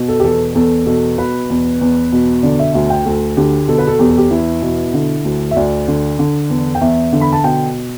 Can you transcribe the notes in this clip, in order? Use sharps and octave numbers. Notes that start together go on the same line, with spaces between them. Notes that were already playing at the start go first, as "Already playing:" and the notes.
Already playing: B2
A4
G4
E2 A4
E2 A4
B2 A4
B2 B4
E2
E2
B2
D3 D5
E5
D2 E5
G5
D2 A4
D3 G4
B2 A4
B4
A4
E2 G4
A4
G4
E2 E4
B2
D3
D2
E5
D2 D5
D3
D3
E2
G5
E2 E5
D3
B5
A5
B2 G5